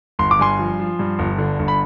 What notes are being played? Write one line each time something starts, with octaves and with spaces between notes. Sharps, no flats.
G1 C6
D6
G2 G#5 C6
F3
F3
G2
G1
D3
G1
B5